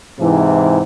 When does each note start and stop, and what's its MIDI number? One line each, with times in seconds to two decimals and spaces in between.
0.19 0.80 44
0.19 0.80 48
0.19 0.80 52